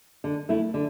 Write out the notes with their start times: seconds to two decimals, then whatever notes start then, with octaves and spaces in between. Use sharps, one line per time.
0.24 D3
0.49 A3 E4
0.74 D3